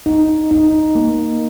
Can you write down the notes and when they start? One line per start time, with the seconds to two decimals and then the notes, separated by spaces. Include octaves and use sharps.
0.06 D#4
0.51 D#4
0.95 A#3